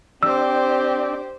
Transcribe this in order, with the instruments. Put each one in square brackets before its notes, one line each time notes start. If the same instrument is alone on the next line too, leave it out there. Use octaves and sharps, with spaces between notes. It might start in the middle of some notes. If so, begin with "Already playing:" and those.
[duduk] C4 [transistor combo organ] D4 D5 [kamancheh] G4 C5 [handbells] E6